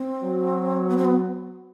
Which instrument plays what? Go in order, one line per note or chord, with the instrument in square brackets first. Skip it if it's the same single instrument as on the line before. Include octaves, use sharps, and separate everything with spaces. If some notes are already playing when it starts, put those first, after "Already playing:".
Already playing: [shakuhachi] C4
[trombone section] F#3
[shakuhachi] B3
C4
B3